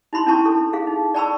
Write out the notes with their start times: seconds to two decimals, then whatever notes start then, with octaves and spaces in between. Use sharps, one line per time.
0.13 D#4 E4 B5 C6
0.26 C#4 D4 E4 A5 C#6
0.45 A4
0.73 G#4 F5
0.87 D#4
1.14 D5 G5 A5 B5 C#6 E6